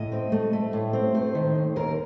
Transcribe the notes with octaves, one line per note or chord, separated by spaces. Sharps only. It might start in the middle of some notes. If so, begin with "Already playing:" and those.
Already playing: A2 D#5
C4
A3
A3
A2
C4
A3 C5
D#3
D#2
D#2 A#4